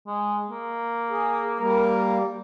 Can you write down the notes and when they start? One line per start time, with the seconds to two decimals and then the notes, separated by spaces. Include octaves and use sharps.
0.07 G#3
0.50 A#3
1.10 G#4
1.60 G3 A#3 A#4